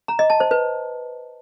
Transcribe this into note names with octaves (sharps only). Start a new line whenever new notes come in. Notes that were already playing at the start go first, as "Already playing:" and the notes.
A#5
D#5
A5
C5
B4